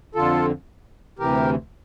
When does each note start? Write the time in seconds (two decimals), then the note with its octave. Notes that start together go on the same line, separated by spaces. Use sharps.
0.15 F2 D3 F4 A4
1.19 D2 C3 E3 G4 A#4